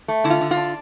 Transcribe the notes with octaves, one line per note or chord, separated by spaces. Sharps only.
A3
D3 E4
F4
D3
F4
D4